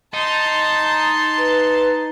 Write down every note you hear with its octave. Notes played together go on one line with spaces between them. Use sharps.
D#4 A5 C6
B4